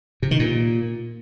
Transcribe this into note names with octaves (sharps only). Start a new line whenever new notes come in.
C3
D#3
A#2